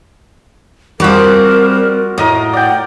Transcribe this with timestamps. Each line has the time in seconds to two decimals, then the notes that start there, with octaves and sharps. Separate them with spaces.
1.00 F3 G3 C4 F#4 A#4 D6
2.18 A2 A#4 D#5 D#6
2.53 D5 F#5 G5